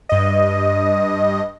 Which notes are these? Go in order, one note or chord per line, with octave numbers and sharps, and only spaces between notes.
G2 D#5